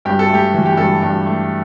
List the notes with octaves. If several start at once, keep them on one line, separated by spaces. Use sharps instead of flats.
G2 G4
A4
A3 G4
E3
G4
G2 A4
G2
A3